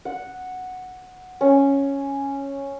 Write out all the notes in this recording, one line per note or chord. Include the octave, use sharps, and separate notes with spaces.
F#5
C#4